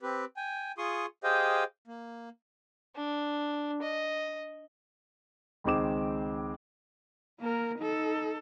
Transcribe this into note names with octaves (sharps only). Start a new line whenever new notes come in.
C4 G4 B4
G5 G#5
F4 G#4 C6 C#6 D#6
G4 G#4 C5 D#5 F5 G5
A#3
D4
D#5
C#2 D#3 G#3 C4 D6 E7
A#3 A#4
D#4 A4